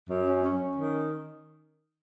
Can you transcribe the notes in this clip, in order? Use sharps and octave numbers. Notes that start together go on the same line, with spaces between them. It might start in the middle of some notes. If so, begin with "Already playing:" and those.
F#2
C#4
C#4
C#4
D#3